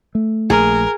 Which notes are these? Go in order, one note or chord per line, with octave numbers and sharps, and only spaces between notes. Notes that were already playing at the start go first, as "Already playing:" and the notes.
A3
A#1 G#4 A#4